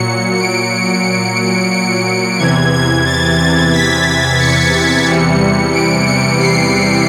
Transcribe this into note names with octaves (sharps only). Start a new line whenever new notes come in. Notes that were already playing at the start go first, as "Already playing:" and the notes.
Already playing: A#2 F#3 C#7
D7
C#7
E2 C3 E3 G#6
G#6
A6
A6
B6
C#7
E2 C3 E3 G3
D7
C#7
C7